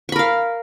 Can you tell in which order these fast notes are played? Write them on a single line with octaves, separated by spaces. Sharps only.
C#6 B5 A#4 F5